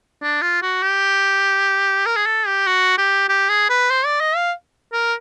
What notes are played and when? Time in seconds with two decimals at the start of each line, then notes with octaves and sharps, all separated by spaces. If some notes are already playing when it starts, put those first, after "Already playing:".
0.21 D4
0.42 F4
0.62 F#4
0.83 G4
2.06 A#4
2.16 G#4
2.26 A4
2.46 G4
2.67 F#4
2.98 G4
3.29 G4
3.49 G#4
3.69 B4
3.90 C5
4.05 D5
4.21 D#5
4.36 F5
4.92 A#4